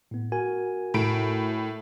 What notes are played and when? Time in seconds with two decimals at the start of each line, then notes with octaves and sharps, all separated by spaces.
0.11 A2 B3
0.32 F#4 A#4 G#5
0.94 A2 D7